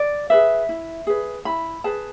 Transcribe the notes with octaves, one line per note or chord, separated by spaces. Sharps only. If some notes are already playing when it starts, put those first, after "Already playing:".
Already playing: D5
G#4 B4 E5
E4
G#4 B4
E4 B5
G#4 B4 A5